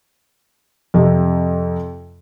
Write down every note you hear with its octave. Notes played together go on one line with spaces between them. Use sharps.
F2 C3